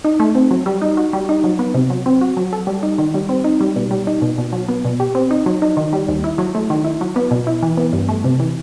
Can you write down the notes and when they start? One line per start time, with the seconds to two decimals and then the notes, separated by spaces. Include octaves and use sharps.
0.05 D#4
0.20 A3
0.35 C4
0.51 F#3
0.66 G3
0.82 D#4
0.97 F#4
1.13 G3
1.29 D#4
1.44 F#3
1.59 B3
1.74 C3
1.90 F#3
2.06 C4
2.21 F#4
2.37 F#3
2.53 A4
2.67 G3
2.83 D#4
2.98 D#3
3.14 G3
3.29 C4
3.44 D#4
3.61 G3
3.76 B2
3.91 G3
4.07 D#4
4.22 B2
4.38 B2
4.53 F#3
4.68 B3
4.85 B2
5.00 G4
5.15 C4
5.31 D#4
5.46 F#3
5.62 D#4
5.77 D#3
5.93 G3
6.08 D#2
6.24 E4
6.38 F#3
6.55 A3
6.70 D#3
6.85 E4
7.01 F#3
7.16 B3
7.31 B2
7.47 E4
7.63 E3
7.77 B3
7.93 G2
8.09 A3
8.24 C3
8.40 E3